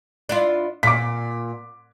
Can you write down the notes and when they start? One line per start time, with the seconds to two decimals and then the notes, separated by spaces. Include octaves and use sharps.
0.29 D4 E4 F4
0.83 A#2 D6 B6